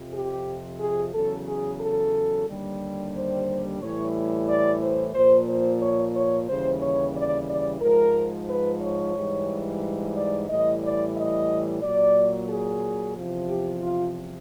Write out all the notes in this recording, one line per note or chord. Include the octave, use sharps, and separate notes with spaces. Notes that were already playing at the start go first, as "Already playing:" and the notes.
Already playing: F2 C3 F3
G4
G#4
E2 C#3 F#3 A4
G#4
A4
D#2 D3 G3
C5
A2 E3 G3 C#5
D5
C5
A#2 F3 C5
C5
C#5
C#5
D#2 C#3 E3 G3 C5
C#5
D5
D5
G#2 F3 A#4
B4
C#5
G#2 E3 G3
D5
A2 E3 G3 D#5
D5
D#5
A#2 F#3 D5
G#4
E2 C3 F3
G4
F4